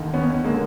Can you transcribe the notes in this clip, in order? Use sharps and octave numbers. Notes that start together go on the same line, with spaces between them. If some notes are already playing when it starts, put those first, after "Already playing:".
Already playing: D#2 D3
B3 C#4
G#3 A#3
D3